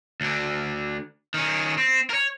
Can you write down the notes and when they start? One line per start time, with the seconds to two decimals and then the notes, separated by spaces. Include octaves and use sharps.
0.21 D2 D3
1.34 D#3 C#4
1.78 C4
2.10 A#4 C#5